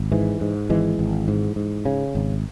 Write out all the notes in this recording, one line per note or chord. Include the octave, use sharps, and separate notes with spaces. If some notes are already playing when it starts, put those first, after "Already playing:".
Already playing: G#1
G#2 E3
G#2
G#1 E3 G#3
G#1
G#2
G#2
C#3
G#1